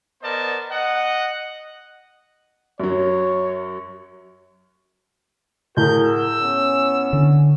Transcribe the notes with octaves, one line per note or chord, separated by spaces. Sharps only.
B3 A#4 C5 D5 D#5 A5
D#5 F#5
F#2 F#3 C#5
A2 F#4 G#4 A#4 G6
E6
B3 C#4
D3 D4